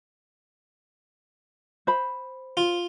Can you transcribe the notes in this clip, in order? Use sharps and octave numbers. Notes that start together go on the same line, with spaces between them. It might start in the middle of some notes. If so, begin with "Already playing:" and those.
C5 B5
F4